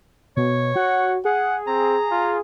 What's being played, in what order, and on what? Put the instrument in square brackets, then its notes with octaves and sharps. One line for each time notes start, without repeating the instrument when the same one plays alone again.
[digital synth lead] B2 [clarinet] C#5
[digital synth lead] F#4 [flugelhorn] F#5
[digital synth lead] G#4 [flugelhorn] F#5
[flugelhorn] C4 [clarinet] A#5
[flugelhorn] F4